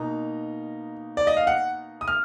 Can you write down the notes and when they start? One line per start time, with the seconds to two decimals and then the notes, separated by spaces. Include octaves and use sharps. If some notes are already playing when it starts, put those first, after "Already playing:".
Already playing: B2 A#3 D#4 A#5
1.17 D5
1.27 D#5
1.37 F5
1.47 F#5
2.01 D#6
2.08 F6